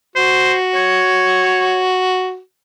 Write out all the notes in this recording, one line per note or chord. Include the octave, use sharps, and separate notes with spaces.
F#4 C5
C#5